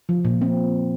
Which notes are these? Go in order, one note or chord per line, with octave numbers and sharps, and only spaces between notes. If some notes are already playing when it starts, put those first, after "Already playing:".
F3
A#2
C4